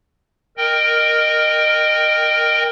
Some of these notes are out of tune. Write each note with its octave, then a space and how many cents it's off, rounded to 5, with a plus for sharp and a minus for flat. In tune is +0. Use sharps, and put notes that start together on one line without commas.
A#4 +0 D#5 -15 G5 +10